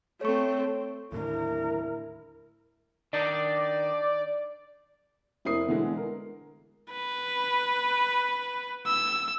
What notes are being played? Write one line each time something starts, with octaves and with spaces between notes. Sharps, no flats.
A3 C4 C#5 C#6
D#2 A2 D3 E4 A#4
D#3 D4 D#4 D5
F1 E4 A#4 D#6 C7
B2 D3 E3 G#3
A#4
B4
E6